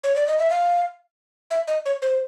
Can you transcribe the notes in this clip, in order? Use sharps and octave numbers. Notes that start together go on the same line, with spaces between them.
C#5
D5
D#5
E5
F5
E5
D#5
C#5
C5